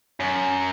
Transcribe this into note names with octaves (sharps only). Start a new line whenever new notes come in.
F#2